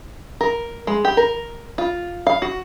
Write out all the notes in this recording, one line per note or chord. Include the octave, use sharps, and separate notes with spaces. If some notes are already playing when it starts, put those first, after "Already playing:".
A#4
G#3
G4
A#4
F4
F5
F#4